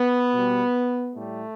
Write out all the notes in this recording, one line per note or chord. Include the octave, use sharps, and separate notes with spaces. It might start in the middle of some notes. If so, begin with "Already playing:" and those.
Already playing: B3
B2 G3
A2 G3 A3